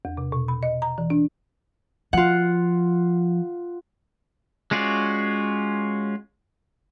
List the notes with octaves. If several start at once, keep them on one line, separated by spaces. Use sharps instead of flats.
E2
C3
B2
B5
D#5
A#5
E3
D4
F3 F4 F#5
G#3 C#4 F4 F#4 D5